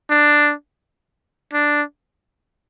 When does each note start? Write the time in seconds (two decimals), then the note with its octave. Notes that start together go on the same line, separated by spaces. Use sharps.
0.10 D4
1.53 D4